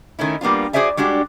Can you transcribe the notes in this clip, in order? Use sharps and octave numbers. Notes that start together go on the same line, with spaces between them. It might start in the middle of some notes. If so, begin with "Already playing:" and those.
D#3 A3 C#4 E4
G3 A#3 B3 D4 F4
F#4 G#4 C5 D5 E5 G#5
G3 G#3 D4 F#4 G4